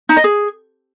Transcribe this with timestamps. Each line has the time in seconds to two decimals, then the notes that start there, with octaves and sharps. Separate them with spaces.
0.09 D#4
0.17 D#5
0.24 G#4